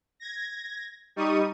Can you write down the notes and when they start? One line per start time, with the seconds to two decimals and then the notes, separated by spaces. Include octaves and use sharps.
0.20 G#6 A#6
1.16 G3 D#4 C#6 D#6 D#7